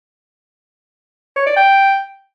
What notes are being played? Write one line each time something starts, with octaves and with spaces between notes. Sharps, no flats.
C#5
D5
G5